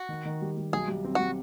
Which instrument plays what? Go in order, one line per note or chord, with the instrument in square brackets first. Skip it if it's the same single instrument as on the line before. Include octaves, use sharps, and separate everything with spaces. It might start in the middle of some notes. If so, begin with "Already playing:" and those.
Already playing: [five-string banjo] F#4
[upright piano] D#3
D#3
G3
G3
[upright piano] B1 [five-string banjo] G#4
[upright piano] G3
C4
[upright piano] G3 [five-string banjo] F#4